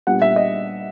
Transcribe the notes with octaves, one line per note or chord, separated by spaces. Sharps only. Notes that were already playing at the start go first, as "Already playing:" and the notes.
A#2 G3 B3 D4 F#5
E5
D#5